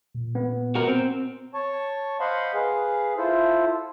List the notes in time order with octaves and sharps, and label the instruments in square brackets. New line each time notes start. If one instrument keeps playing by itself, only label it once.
[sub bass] A#2
[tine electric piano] B3
[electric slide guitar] F#4 A#4
C4
[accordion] C#5 A5 C#6
C5 D#5 F5 F#5 B5 C6
G#4 B4 F5
E4 F4 A4 C5